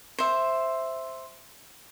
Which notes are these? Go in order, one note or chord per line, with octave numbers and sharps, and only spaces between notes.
C5 E5